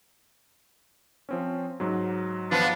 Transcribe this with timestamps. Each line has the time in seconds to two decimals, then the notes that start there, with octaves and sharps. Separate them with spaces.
1.29 F3 C4 C#4
1.80 G#2 F#3
2.51 F3 B3 D4